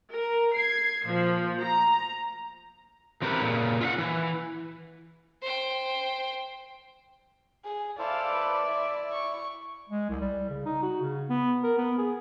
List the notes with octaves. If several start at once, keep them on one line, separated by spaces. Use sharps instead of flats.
A#4
G#6 C7
A#2 F3
A#5
E3 C4 G4 A#4 B4
A#2 C#3
F4 E5 F#5
E3
C5 G5
G#4
E4 A4 C5 D5 F5
B4
E4 E5
C#6
G#3
C2
G3
C#3
D#4
F#4
C#3
B3
A#4
B3
G#4